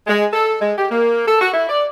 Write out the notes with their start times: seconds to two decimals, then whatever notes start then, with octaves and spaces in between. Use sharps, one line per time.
0.07 G#3
0.33 A4
0.61 G#3
0.78 G4
0.91 A#3
1.27 A4
1.41 F#4
1.54 E4
1.69 D5